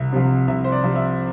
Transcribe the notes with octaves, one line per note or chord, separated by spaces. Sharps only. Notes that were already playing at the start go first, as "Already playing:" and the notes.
Already playing: C2 E5
C3 F3
C2 E5
C5
D5
C3 F3
E5